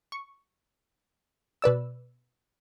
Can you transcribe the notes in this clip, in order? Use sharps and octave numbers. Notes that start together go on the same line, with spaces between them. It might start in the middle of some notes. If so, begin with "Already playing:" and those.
C#6
B2 B4 D5 E6